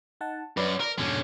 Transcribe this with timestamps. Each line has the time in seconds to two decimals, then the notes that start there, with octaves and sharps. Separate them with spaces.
0.21 D#4 F#5 A5
0.57 F#2 B4 D5
0.80 A#4
0.98 F2 G#2 B2 D3 C#4